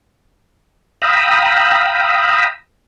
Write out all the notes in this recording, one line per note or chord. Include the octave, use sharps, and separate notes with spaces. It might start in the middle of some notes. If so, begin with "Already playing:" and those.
F5 G5 A#5 B5 D#6 E6